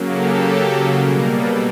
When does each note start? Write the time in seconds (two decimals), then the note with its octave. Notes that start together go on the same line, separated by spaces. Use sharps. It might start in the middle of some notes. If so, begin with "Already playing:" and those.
Already playing: C#3 F#3 A#3
0.11 G4 A4
1.00 B2 G3 A#3 G#4 A#4
1.30 A4 B4